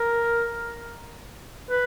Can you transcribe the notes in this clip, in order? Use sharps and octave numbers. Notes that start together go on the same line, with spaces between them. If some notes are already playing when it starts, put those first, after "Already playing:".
Already playing: A#4
B4